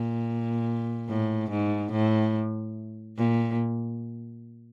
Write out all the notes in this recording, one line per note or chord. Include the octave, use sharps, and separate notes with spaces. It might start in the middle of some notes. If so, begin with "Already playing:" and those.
Already playing: A#2
A2
G#2
A2
A#2